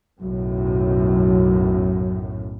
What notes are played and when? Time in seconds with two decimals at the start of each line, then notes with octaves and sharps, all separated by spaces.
0.21 B1 F#2 A2 F#3